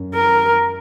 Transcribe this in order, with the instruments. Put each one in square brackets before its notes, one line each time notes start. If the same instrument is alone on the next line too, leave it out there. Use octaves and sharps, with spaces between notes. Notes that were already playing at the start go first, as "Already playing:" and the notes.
Already playing: [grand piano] F#2
[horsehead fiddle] A#4